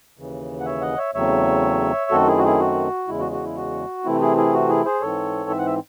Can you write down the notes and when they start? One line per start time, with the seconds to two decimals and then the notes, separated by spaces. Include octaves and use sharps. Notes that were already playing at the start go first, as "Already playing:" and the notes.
0.17 D#2 C#3 E3
0.60 F#5
0.65 C#5 E5
0.82 D#5 F#5
0.98 C#5 E5
1.14 E2 C#3 F#3 A3 C4 C#5 E5
2.11 F#2 D#3 A3 C4 F#4 A4
2.27 E4 G#4
2.38 F#4
2.44 E4 G#4
2.60 F#4
3.08 E2 C#3 G#3 E4
3.20 F#4
3.32 F#4
3.44 E4
3.56 F#4
4.05 C3 E3 A3 C4 E4
4.21 E4 G#4
4.37 E4 G#4
4.54 F#4
4.69 E4 G#4
4.86 G#4 C5
5.01 G#2 E3 C4 A4 C#5
5.50 E5
5.58 F#5
5.67 E5